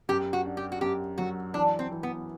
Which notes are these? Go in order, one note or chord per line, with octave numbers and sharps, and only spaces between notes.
F#2 G4
F#4
D4
G4
F#4
F#2 G4
F#3 F#4
E3 D4
C4
E3
B3